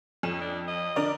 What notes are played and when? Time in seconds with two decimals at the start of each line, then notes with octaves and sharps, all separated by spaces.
0.23 F2 C#4 E7
0.41 D4
0.68 D#5
0.96 D3 A#4 D5